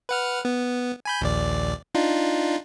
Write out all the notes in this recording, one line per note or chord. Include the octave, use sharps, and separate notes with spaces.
B4 F#5 F6
B3
G#5 B5 G6
A#1 D#2 D5
D4 D#4 F4